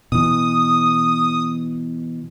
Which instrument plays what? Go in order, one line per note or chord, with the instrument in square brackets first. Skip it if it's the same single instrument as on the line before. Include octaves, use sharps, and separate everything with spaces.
[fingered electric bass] B2 E3 [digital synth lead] D#6